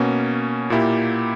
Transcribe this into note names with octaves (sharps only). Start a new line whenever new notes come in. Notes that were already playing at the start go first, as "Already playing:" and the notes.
Already playing: B2 A#3 C#4
A#2 A#3 E4 G4